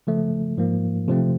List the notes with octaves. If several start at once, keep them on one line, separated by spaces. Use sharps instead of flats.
C#3 F3 A3
G#2 F3 A#3
C3 F3 A3 C4